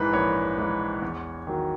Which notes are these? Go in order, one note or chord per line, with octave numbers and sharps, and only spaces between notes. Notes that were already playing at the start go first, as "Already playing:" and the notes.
Already playing: A#1 G#2 E3 B4
A#1 C#5
G#2 E3
E2
D#3 F#3